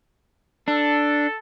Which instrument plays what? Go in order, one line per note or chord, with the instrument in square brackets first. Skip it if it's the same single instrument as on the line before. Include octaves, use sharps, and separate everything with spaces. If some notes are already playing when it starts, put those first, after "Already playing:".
[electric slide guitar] D4 [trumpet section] A4